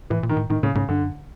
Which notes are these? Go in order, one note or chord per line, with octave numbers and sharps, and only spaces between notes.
A2 E3
A#2
D#3
A2
A2 D#3
A2 C#3
G#2 C#3
G2 D3
F#2